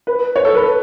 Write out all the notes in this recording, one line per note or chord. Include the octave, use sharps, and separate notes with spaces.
B4
C#5
A4
B4